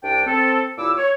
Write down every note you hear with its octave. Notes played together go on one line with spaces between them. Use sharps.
C2 D4 G5
C4 A4
D#2 A#2 E4 D6 E6
C#5